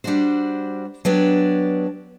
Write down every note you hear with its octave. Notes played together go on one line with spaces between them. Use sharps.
G3 D4 F#4 C5
F#3 B3 D4 G4